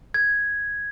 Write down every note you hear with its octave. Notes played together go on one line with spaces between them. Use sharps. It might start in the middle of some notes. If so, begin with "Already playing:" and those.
G#6